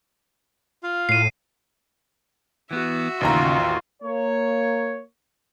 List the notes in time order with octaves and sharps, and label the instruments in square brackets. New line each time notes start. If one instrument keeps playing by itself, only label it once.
[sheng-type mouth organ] F4 F5
[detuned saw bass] A2 [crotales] C7 D#7
[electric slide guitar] E3 B3 [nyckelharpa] F#4 E5
[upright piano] A1 D#2 A#5 [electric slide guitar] C#3 [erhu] F4
[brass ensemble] A#3 C#5